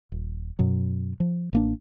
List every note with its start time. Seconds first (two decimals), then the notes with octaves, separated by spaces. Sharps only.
0.12 D#1
0.59 F#2 B2 F#3
1.20 F3
1.53 A1 A#3 D4